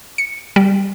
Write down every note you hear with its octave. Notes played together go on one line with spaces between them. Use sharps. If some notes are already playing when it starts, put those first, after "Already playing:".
C#7
G3